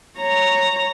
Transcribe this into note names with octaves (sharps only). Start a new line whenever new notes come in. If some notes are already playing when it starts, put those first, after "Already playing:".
C#5 A#5